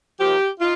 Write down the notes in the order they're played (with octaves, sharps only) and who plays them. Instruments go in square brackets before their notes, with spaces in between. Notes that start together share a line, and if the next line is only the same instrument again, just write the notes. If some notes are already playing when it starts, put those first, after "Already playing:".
[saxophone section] F3 A#3 D#4 G4
D#4 F4